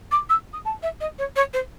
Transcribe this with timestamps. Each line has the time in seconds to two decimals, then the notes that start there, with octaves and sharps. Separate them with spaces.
0.11 D6
0.29 E6
0.53 D#6
0.65 A5
0.82 E5
1.00 D#5
1.18 C#5
1.36 C#5
1.53 C5